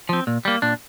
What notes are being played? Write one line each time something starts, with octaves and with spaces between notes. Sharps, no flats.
F3 C4
A#2
G3 A#3
A#2 D4